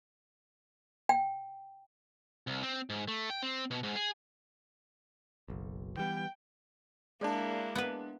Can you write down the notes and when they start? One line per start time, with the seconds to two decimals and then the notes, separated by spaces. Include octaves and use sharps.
1.09 G5
2.47 C2
2.63 C4
2.90 G#2
3.08 A3
3.30 G5
3.43 C4
3.71 B2
3.83 G#2
3.96 G#4
5.48 F#1 B1
5.97 E3 G3 B3 G5
7.21 G#3 A#3 D4 E4 G#4 D5 A5
7.75 B3 B4